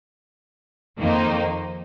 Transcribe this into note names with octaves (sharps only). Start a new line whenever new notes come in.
F2 D#3 A#3 D#4 C5